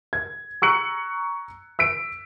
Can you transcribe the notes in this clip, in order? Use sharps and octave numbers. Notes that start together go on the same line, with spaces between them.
G#6
A#5 C#6 E6 F#6 C#7 F#7
E6 B6 D7